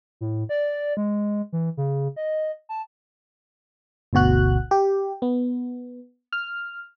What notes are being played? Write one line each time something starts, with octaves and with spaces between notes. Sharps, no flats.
A2
D5
G#3
E3
C#3
D#5
A5
G1 D2 B2 F#4 F#6
G4
B3
F6